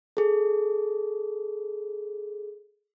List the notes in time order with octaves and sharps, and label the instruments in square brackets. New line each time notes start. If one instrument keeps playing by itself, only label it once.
[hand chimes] G#4 A4